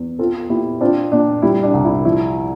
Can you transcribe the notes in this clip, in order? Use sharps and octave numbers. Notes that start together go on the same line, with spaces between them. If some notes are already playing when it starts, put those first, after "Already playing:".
Already playing: E2
C4 F4 A4
A#2 E4 G4
C4 D4 F4
A#2 D4
G3 E4
D4
C2
E4
F3 E4